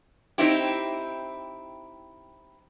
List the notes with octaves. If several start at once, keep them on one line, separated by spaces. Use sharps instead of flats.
C4 D#4 E4 G4